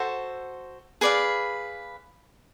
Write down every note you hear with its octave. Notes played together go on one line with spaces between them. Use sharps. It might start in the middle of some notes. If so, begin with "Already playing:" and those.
Already playing: F#4 A4 C5
G#4 B4 D5 F5